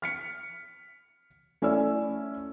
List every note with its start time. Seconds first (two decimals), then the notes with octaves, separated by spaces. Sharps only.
0.02 F6 B6 C#7
1.62 A3 C#4 E4 D5 E6